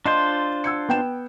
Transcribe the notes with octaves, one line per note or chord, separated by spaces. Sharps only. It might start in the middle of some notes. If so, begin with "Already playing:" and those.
D4 F4 C5 D#5 C6
E6 G#6 C#7
B3 G5 E7